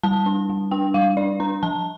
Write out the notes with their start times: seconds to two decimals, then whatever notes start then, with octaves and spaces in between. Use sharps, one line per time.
0.03 G3 A5
0.26 D4
0.49 G3
0.71 D4 G5
0.94 G3 F5
1.17 D4 D5
1.40 D4 A#5
1.63 F3 A5